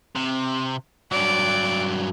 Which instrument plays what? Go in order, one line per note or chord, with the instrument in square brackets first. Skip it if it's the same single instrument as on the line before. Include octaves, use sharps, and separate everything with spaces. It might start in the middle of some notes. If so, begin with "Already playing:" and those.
[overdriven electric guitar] C3
[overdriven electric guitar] G2 F#3 [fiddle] D5